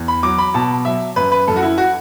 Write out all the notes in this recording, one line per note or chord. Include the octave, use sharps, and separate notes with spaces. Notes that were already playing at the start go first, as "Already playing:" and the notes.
Already playing: E2
B5
F#3 D6
B5
B2 A5
F#3 E5
F#2 B4
B4
F#2 A4
F#4
E4
F#4